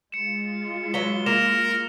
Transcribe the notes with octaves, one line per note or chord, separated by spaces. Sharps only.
G#3 F4 C#7 E7
F#3 B4 A#5 B6 G7
A#3 A#4 E7 F7